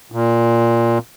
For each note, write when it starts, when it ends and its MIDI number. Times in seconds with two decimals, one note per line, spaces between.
0.12 0.98 46